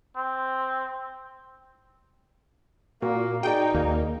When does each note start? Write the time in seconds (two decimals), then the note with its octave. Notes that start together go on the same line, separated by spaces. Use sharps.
0.16 C4
3.02 A#2 A#3 F#4
3.43 D#4 F#4 G#4 D5 G5
3.74 D#2 A#3